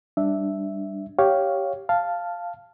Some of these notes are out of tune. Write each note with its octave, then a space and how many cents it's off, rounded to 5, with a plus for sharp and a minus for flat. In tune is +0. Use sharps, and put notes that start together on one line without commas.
G3 +0 D4 +0 E5 +0
G4 -5 C#5 +0 F5 +0
F5 -5 A5 +0